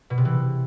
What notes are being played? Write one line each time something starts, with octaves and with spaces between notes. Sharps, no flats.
B2
C3
E3